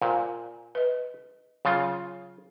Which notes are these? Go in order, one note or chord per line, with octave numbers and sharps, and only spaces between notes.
A#2 C5 G5 G#5
B4 D#5
C#3 F#3 F4